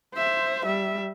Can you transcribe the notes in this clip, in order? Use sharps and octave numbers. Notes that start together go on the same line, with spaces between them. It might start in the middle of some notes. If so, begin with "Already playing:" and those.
C5 E5
G3 E5